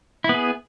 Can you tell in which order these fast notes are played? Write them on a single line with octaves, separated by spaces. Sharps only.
E4 B3 G#4